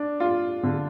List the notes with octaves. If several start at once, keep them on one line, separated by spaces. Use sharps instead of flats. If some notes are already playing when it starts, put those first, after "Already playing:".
Already playing: D4
F4
D3